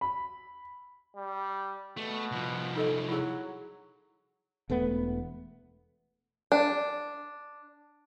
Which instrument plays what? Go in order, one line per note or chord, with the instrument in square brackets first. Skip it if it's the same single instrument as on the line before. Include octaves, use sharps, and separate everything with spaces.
[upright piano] B5
[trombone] G3
[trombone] B2 [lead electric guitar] A3
[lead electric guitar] C2 F3
[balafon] D#4 A4 D#5
[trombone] F#3 [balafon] E4 G#4
[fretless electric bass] E1 A3 B3
[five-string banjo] D4